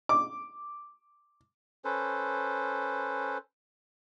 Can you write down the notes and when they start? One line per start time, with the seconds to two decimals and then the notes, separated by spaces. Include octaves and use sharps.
0.09 D6
1.85 C#4 A4 B4 C5